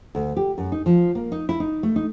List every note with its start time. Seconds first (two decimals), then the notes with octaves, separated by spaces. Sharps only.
0.15 D2
0.37 G4
0.58 F#2
0.72 D#4
0.86 F3
1.15 A#3
1.32 D#4
1.49 E4
1.60 D#4
1.83 A3
1.96 D#4